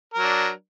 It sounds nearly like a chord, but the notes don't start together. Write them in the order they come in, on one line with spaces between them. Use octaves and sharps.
A#4 F#3 D4